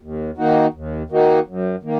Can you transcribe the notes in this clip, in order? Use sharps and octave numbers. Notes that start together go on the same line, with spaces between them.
D#2
D#3 A#3 D#4 F#4
D#2
D#3 A#3 D#4 F#4
F#2
D#3 A#3